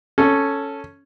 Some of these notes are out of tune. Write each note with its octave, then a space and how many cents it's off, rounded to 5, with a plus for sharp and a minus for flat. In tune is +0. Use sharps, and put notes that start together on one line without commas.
C#4 +0 A4 +0